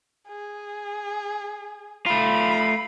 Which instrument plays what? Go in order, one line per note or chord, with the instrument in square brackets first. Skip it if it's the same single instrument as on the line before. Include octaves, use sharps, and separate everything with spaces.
[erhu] G#4
[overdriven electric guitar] A3 F4 [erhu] B5